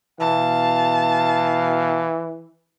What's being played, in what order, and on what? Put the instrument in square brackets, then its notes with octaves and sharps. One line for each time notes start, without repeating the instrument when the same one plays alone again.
[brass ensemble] B2 F5 [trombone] E3 [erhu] A5